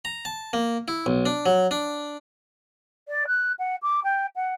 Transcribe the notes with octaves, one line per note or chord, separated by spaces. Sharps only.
A#5
A5
A#3
E4
B1
D4
F#3
D4
D5
F#6
F#5
D6
G5
F#5